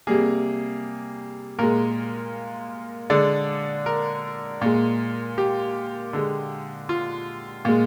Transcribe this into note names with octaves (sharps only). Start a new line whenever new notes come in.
C3 G3 A#3 G#4
A#2 G#3 A#4
D3 G#3 D5
A#4
A#2 G#3
G4
D3 G#3
F4
A#2 G#3